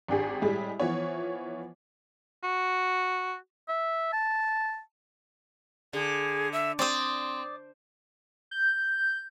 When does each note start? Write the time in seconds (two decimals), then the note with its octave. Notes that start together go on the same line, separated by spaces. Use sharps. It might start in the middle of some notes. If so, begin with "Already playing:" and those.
0.08 G#1 D4 G4 G#4
0.42 A2 G3 G#3
0.79 E3 F3 B3 C#5
2.44 F#4
3.69 E5
4.13 A5
5.93 D3 G#4
6.53 E5
6.79 C4 D5 C6 D#6
8.51 G6